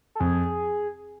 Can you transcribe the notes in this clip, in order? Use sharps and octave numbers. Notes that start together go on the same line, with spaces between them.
A4
F2 G#4